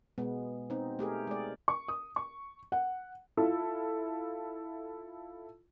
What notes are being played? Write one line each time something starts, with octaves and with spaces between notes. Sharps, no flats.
B2 G#3 B3
C4 D#4
A3 G4 G#4 A#4
G#3 D5
C#6
D#6
C#6
F#5
E4 F4 A4